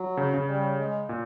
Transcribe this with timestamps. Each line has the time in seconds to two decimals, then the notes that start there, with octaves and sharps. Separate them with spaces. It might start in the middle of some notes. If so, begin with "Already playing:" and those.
Already playing: F#3
0.17 C#3
0.34 C#3
0.49 G3
0.79 G#3
1.09 A#2